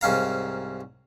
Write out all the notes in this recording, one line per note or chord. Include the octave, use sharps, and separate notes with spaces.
C2 G#2 C#4 F5 A#5